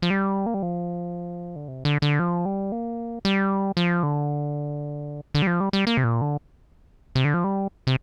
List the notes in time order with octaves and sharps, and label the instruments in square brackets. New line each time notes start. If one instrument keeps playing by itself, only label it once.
[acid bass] F3
G3
A#3
G3
F3
D3
C3
D3
D3
F3
G3
A#3
G3
F3
D3
D3
G3
F3
G3
G3
A#3
C3
A#2
D3
C3
D3
F3
G3
C3